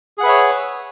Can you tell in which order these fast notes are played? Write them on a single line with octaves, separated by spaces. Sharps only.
G#4 F#5 B4 E5 C#5